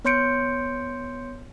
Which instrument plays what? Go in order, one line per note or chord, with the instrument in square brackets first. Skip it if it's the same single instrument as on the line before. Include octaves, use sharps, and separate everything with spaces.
[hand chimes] B3 C#5 C6 G6 C#7 D7